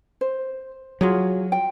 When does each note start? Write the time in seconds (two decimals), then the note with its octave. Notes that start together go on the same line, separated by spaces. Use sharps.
0.21 C5
1.01 F#3 F4 F#4 G#4
1.52 G5